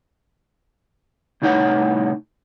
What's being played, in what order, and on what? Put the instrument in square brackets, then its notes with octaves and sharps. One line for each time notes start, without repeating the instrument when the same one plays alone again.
[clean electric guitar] C2 A2 D#4 C#5 F#5